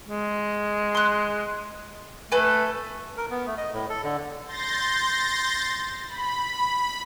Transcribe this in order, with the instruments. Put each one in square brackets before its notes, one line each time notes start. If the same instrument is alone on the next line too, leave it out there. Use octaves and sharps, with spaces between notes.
[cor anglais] G#3
[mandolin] C6 F#6
[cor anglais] A3 [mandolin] A4 B4 G#5
[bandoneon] A#4
B3
A3
D#5
A2
A4
D3
[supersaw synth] C6 G6 A6 A#6
B5